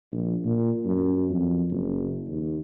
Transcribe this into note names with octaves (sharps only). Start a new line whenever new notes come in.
A#1
A#2
F#2
F2
F#1
D#2